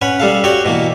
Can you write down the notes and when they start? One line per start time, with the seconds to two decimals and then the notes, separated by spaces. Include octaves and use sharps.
0.02 C#4 B4 F#5
0.20 G3 A4 F5
0.44 F#4 C#5 D5 F#5 G5
0.65 B2 E3 A#3